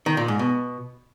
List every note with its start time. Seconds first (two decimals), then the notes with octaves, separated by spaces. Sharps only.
0.06 D#3
0.17 A#2
0.28 G#2
0.39 B2